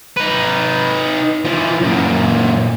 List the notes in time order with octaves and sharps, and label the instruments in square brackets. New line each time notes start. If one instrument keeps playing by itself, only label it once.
[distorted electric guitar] D#4 B4
E3 F3
F#2 A#2